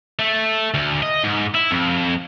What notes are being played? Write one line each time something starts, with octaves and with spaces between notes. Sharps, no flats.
A3
D2
D#5
G#2
E4
F2